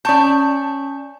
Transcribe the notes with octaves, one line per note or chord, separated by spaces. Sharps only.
C#4 D5 A5 C#6 G6